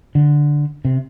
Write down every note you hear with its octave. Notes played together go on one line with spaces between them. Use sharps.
D3
C3